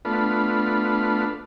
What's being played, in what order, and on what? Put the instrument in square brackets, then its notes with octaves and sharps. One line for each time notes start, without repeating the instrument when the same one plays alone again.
[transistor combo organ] A3 B3 D4 F4 B4